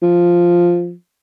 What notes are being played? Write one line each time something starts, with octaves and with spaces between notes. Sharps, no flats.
F3